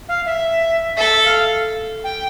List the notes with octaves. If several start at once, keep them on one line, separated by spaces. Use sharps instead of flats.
F5
E5
A4 E5
F5
G5